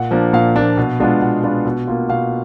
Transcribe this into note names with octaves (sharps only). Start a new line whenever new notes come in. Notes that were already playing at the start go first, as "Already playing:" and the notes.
Already playing: A#2 F#5
F3 A#3 D4
A#2 F5
F3 A#3 D4
B2
G#3 B3 D4 F4
B2 F#5
G#3 B3 D4 F4
B2
A#3 F4
B2 F5